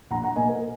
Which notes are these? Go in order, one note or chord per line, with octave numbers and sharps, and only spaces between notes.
A#1 F#5 A#5
F#5 A#5
A#2 A#3 D#5 G#5
A#4